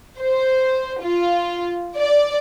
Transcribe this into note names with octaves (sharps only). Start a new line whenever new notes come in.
C5
F4
D5